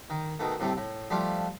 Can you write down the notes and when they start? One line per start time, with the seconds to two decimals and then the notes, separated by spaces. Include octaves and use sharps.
0.10 D#3
0.39 B2 D#3 A3
0.60 A2 C3 G3 A3
0.77 A2
1.10 F3 G3 A3 D4 F4